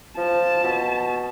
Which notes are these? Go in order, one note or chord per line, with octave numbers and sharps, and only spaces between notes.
F3 A5
B2